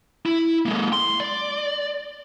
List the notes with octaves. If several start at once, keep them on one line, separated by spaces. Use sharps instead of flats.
E4
G#3 A#3
C6
D5